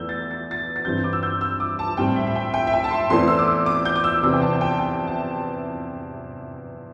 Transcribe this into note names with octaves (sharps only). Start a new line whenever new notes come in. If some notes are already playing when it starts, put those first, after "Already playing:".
Already playing: E2 E3 A3 E6 G6
A6
A6
A6
A6
G2 E3 G3 C4 G6
D6
E6
G6
E6
D6
A5
A2 G3 C4 G5
E5
E5
G5
G5
E5
G5
A5
C6
E2 E3 A3 C4 C6
E6
D6
D6
G6
D6
E6
E2 C3 E3 C4 D6
G5
A5
G5
A5
G5
A5